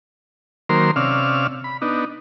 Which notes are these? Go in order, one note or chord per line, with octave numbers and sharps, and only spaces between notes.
D#3 F#3 A#3 A#4 C5 C6
C3 C#4 D5 F5 E6 F6
B5
B3 D4 D#4